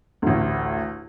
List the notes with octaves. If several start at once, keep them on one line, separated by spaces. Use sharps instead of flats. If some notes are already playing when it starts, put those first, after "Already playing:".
A1 D2